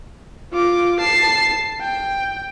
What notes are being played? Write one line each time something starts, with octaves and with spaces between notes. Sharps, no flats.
F4 D6
A5 C7
G5